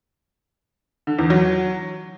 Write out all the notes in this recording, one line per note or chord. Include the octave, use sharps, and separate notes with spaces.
D3
E2
F#3